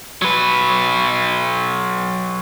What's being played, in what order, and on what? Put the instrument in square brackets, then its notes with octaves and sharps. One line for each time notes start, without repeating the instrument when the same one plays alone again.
[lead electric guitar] F#3 B4